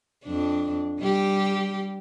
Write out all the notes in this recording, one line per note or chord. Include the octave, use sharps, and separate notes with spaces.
F2 D4
G3 G4